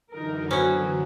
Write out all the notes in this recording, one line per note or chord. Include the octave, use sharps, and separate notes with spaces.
F#2 D3 E3 D#4 A#4
F#3 B3 C#4 C5 C#5